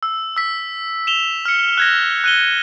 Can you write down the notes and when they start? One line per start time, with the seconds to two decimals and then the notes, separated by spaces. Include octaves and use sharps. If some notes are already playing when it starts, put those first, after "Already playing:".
0.03 E6
0.36 E6 B6
1.07 E7 F7 G7
1.45 F6 C#7
1.78 F#6 G#6 A#6
2.24 F#6 D#7 G7